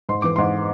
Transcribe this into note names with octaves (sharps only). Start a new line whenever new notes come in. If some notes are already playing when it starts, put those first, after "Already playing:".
G#2 C6
E3 D6
G#2 C6